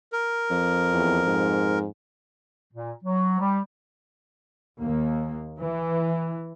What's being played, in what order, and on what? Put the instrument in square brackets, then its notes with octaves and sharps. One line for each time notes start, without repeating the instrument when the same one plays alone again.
[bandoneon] A#4
[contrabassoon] F2
[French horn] E2
G#2
[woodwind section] A#2
F#3
G3
[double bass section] D#2 A#3
E3